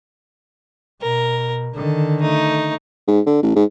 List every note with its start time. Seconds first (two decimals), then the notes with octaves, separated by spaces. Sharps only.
1.02 B2 A#4
1.76 D3 D#3 A4
2.21 A3 D#4
3.07 G#2
3.26 D3
3.43 A1
3.55 G#2